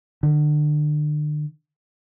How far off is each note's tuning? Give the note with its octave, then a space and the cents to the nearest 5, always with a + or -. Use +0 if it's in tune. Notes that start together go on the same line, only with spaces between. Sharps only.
D3 +35